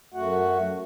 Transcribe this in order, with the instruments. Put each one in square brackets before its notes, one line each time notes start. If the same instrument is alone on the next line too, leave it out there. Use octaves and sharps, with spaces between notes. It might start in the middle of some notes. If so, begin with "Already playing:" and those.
[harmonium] F#2 A3 F#4 F#5